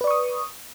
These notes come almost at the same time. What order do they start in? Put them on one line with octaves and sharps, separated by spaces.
B4 D5 C#6 D#6